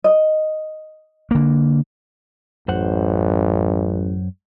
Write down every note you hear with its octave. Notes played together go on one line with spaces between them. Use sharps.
D#5
D3 A#3
A1 F#2 C5 F#5